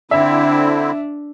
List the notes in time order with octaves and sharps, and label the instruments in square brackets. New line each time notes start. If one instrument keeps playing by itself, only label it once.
[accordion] D3 C4 E4 [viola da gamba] D4 [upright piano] E5